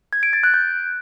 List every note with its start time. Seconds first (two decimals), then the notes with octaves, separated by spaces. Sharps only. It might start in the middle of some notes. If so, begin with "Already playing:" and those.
0.13 G#6
0.23 D7
0.33 A6
0.43 F#6
0.54 G6